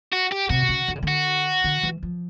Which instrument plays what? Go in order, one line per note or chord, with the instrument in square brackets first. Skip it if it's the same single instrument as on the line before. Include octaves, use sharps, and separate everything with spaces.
[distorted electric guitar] F#4
G4
[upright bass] C3 [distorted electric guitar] F#4
[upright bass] C#3
D3
C#3
D3
[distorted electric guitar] F#4
[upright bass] D3
E3
F3